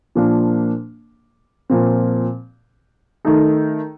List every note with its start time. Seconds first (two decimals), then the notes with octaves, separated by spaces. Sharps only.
0.15 A#2 F3 A#3 D4
1.70 A#2 F3 C4
3.25 D#3 A3 D#4 A4